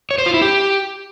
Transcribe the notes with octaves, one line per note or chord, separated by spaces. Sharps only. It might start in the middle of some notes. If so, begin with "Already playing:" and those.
C#5
C5
F4
E4
G4